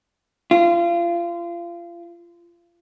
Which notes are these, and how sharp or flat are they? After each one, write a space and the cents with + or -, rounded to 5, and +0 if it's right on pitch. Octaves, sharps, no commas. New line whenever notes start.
F4 -30